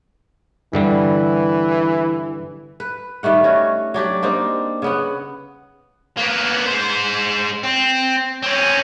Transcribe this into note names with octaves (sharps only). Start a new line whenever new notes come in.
G2 D3 E3 G3
B4
D#3 G3 A3 F#5
C#4 F#4
F#3 D4 G4 D5
A#3 C4 D4 D#4
C#3 B3 F#5
A#3 B3
G#3 C5
C4
C4 C#4